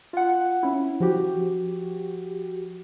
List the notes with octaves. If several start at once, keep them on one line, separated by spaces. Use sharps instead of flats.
F4 F#5
C#4 E4
F3 F#4 G4